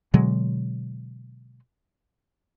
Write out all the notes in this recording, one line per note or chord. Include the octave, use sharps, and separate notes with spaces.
B2 D3 F#3 G#3